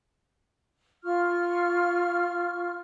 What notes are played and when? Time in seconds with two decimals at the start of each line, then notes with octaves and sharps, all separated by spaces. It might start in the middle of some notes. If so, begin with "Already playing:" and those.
1.04 F4 C#6 F6